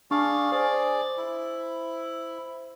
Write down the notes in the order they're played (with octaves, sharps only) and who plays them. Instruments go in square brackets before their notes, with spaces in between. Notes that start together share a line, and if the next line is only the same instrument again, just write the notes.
[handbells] D4 C#6 [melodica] G#4 D5 F5
[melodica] G#4 D5 [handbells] C5
[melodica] E4